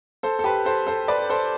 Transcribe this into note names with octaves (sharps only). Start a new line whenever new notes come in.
A4 C5
A4
G4 B4
A4 C5
A4 C5
B4 D5
A4 C5